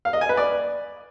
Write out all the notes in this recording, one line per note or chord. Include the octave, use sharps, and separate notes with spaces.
F5
D#5
G#5
B4
D5